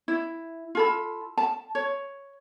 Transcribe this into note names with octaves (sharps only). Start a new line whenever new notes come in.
E4
F4 A4 B5
A5
C#5